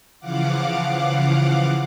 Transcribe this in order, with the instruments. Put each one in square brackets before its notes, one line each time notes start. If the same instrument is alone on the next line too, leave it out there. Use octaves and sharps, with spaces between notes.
[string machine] C#3 E3 F3 F5 F#5 D6